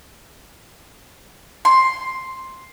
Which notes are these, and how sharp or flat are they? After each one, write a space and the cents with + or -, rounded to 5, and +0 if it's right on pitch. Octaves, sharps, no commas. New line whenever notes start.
C6 +5